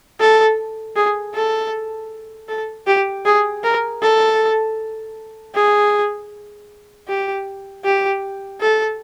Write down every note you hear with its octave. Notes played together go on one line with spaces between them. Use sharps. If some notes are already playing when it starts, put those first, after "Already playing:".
A4
G#4
A4
A4
G4
G#4
A#4
A4
G#4
G4
G4
A4